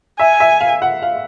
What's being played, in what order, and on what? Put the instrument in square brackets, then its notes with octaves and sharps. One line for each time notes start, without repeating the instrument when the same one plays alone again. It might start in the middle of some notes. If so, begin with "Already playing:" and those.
[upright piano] E5 [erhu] G#5
[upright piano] E5
F5
F#5
F5